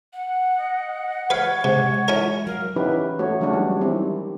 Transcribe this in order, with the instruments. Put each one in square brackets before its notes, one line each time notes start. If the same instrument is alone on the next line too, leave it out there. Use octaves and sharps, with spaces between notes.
[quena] F#5
[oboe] D#5
[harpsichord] B4 F5 [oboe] C#5
[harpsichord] C3 [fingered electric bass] G#3
[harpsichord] C#4 E4 A#4
[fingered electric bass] F#3 [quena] A#4 [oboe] F5
[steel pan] E3 C#4 D#4 E4 G4 B4
A3 F#4 C#5
E3 F#3 G#3 C#4 D4 F#4
G3
D#3 G3 C4 E4